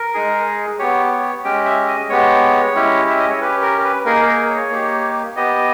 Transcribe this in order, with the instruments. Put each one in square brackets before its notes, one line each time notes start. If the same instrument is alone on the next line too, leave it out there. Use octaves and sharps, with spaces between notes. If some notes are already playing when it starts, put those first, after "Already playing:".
Already playing: [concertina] A#4
G#3 D#4 G#4
B3 G4 C#5
C#5
G#3 C#4 G4 G5
E5
D#5
G#3 B3 G4 C#5
G#3 C#4 E4 G4
E5
D#5
C#5
C#4 G4 B4
A#4
B4
A#3 D#4 G#4 A#4
A#4
C#5
A#3 D#4 G4
B3 G4 D#5